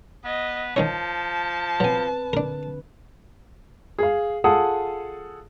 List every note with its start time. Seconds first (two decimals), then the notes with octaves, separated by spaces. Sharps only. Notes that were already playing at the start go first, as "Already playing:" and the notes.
0.25 B3 D#5
0.76 D#3 F3 D#4 C#5 A5
1.80 F#3 C4 B4 G#5
2.33 D3 D4 A#4
3.99 G#4 F5
4.44 F4 G#4 A4 F#5 D#6